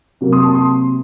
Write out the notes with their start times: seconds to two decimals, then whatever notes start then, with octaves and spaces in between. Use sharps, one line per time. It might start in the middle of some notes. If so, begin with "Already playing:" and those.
0.21 C3 F#3 A#3
0.33 C6 D#6
0.44 A5 C6
0.55 C6 D#6